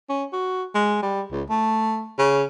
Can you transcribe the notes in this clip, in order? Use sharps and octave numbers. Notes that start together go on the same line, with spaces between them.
C#4
F#4
G#3
G3
C#2
A3
C#3